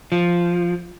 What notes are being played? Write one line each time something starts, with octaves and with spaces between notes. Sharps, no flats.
F3